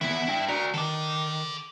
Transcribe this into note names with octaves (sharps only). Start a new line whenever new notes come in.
D#3 E3 B3 E4
D4 G5
F#4 A#4 D5
D#3 A4 D5